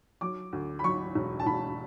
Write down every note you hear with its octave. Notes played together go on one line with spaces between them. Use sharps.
F#3 D6
D2
B5
F#3 C#6
E1
A5
E1 B5